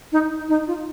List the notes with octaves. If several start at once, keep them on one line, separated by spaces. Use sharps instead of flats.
D#4
D#4
F4